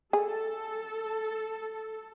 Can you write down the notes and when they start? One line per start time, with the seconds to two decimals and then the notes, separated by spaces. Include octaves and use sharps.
0.13 G#4 A4